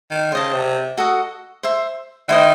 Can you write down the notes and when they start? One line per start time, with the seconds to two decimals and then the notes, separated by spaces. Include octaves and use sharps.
0.11 D#3
0.32 C#3 C5 D#5 A5
0.54 C3
0.97 F#4 A4 D#5 F#5
1.63 C5 E5 C6
2.29 D#3 E4 C5 D#5